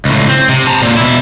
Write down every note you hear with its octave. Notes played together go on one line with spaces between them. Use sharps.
C#2 A2
C4
C3
A5 A#5
A#2 D3
B2 E4